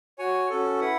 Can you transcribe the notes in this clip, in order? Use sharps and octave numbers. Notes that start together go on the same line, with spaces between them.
F#4 C#5 G#5
C#4 F#4 A4
E4 B4 F#5